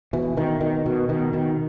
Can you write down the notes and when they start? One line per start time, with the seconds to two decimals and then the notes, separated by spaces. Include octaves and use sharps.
0.13 B2 E3
0.37 B2 D#3
0.60 B2 D#3
0.86 B2
1.09 B2 D#3
1.33 B2 D#3